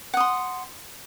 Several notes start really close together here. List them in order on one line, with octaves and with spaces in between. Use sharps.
F#5 D#6 C6